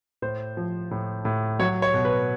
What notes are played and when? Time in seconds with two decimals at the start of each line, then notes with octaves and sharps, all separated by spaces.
0.22 A2 C5
0.57 F3
0.91 A2
1.25 A2
1.59 F#3 C#5
1.82 C#5
1.94 B2
2.05 B4